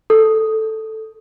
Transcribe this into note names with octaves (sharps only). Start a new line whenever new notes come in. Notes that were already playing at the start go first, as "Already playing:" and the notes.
A4